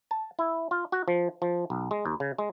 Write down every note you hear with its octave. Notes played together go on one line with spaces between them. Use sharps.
A5
E4
F4
F#4
F3
F3
B1
G#3
D#2
C#3
G#3